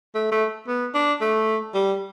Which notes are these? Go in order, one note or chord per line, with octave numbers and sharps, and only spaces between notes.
A3
A3
B3
D4
A3
G3